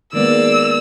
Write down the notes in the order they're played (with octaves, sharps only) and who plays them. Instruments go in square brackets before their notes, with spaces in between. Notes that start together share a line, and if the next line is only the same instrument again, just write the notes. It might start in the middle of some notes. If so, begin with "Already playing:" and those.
[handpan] D#3 G#3 B3 [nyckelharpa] A#3 D5 [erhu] E6